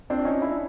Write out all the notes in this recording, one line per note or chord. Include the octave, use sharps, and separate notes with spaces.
C4 D4
C#4 D#4
D4 E4